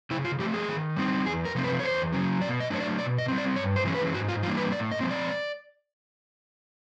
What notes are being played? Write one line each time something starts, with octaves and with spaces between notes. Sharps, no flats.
C#3 E4
F4
F3 A3 G4
G#4
D#3
G3 C4 D#4
E2 G#4
A#4
C3 F3 A3 C4
B4
C#5
E2 C5
C#3 F#3
B2 D5
D#5
F#3 A3 D4 C#5
D5
B2 D5
D#5
G3 C4
D5
G2 C#5
C5
E3 G#3 C#4
B4
G#2 F#4
F4
E3 G3 A#3 D4 F4
B4
A2 D5
D#5
F3 G#3 C4
D5